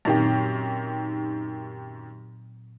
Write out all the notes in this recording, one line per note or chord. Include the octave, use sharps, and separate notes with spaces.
F#2 A#2 D#3 F#3 C4 G4